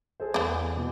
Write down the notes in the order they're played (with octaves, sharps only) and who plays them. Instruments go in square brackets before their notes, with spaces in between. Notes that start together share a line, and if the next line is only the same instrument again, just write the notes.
[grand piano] G#4 A4 C5
[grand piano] E2 [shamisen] B3 D5
[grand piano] B2